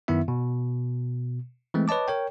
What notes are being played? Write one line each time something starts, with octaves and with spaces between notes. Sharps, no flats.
F#2 D#3 B3 E4 E5
B2
E3 G#3 A3 C4
B4 C#5 D#5 A5 D6
A#4 C#5 G5